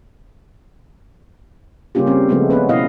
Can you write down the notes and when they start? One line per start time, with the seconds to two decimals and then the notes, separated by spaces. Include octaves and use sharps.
1.95 C#3 G3 A#3 C#4 F4 G4
2.06 G3 C4
2.29 C#3 F3 G#3 A3 B3 C4
2.50 B3 C#4 B4
2.69 B2 E4 D#5 F5